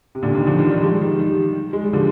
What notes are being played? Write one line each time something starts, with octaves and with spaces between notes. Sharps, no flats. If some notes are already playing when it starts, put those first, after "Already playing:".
C3
A#2 D3
C3 D#3
D3 F3
D#3 G3
D#3 G3
F3 G#3
D#3 G3
D#3 G3
G#3
G3
D3 F3